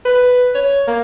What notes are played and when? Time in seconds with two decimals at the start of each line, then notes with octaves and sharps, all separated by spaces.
0.05 B4
0.55 C#5
0.87 A#3